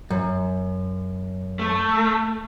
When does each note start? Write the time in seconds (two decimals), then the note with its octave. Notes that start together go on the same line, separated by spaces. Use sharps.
0.10 F#2
1.59 A3